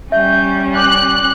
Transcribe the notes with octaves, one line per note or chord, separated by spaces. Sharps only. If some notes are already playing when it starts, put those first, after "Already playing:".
G3 C#4 E5 G6
D6 F#6